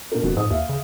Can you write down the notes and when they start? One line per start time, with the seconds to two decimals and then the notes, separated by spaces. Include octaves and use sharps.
0.12 B2 D4 A#4
0.23 D#1 F2 D3 F#4
0.37 G#2 D#6
0.51 D#2 E5 F5
0.69 C#3